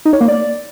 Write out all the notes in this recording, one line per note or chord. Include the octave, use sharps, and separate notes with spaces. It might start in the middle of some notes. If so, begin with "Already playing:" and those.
D#4
C#5
A#3
D5